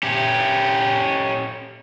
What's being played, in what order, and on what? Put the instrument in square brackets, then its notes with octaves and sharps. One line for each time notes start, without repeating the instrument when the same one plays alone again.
[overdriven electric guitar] C#4 G4